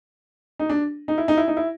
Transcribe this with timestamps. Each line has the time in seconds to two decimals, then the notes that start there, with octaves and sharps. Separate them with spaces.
0.59 D#4
0.69 D4
1.08 D#4
1.18 E4
1.28 D#4
1.37 E4
1.48 D#4
1.57 E4